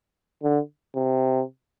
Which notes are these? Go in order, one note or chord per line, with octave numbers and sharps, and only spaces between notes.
D3
C3